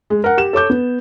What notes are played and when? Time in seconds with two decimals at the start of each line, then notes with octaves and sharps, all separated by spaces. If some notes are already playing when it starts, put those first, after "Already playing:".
0.10 G#3
0.24 A#4 F#5
0.37 G4 E7
0.53 A4 C#5 D6 G6
0.70 B3